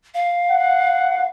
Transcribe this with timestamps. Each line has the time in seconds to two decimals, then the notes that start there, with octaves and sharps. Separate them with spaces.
0.14 F5
0.50 F#5